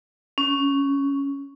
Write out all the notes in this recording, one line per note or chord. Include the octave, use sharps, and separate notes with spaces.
C#4